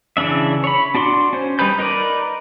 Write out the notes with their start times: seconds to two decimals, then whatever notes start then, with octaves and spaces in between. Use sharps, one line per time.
0.17 C#3 E3 D4 E5
0.64 C#5 B5
0.95 D4 F#4 D5 C6
1.33 C#4 C5
1.59 G3 D#4 B4 B5 G6
1.79 D#4 A#4 B4 D5